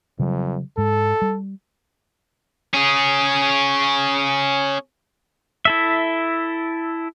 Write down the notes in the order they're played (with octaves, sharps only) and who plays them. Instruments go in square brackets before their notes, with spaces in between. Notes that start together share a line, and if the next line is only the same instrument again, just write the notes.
[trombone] F2 [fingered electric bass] C#3 F#3 G3
[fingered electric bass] G#2 G#3 [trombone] A4
[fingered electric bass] G3
[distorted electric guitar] C#4 G#4
[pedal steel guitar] E4 A4 E5